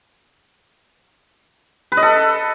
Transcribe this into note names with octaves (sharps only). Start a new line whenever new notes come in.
B4
D#5
A4